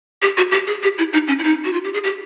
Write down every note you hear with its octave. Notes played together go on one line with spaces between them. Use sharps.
G4
F#4
G4
G#4
G4
E4
D#4
C#4
E4
D#4
F#4
F4
G4
G#4
G4